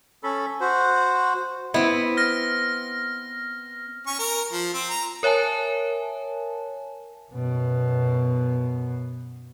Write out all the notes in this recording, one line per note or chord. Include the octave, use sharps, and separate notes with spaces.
C#4 A4 B5
F#4 C5
B3 C4 E4
F6 A#6
C#4 C#6
A#4
F3
C4
A#5
A#4 C#5 E5 G#5 A5
F#2 B2